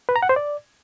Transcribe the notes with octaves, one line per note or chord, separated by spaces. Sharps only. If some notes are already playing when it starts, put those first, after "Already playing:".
B4
A#5
F#5
C5
D5